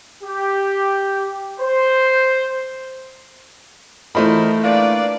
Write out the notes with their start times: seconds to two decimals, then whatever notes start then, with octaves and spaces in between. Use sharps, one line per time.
0.22 G4
1.59 C5
4.15 E3 A3 F4 A#4 C5 D#5 B5
4.63 A#3 D4 B4 D5 F5